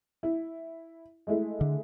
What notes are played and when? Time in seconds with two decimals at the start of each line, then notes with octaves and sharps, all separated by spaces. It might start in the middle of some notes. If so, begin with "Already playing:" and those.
0.23 E4
1.27 G#3 A3 E4
1.61 D3